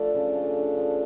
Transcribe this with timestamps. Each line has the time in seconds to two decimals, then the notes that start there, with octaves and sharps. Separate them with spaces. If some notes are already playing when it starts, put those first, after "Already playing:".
Already playing: F3 A3 D4
0.15 C#3
0.35 A3
0.56 D4
0.78 F3